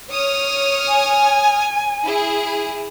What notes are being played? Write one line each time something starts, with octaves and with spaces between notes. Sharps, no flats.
C#5 D#6 F6
G#5
E4 G#4